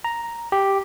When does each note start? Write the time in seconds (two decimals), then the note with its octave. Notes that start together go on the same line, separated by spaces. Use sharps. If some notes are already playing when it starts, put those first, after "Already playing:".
0.04 A#5
0.52 G4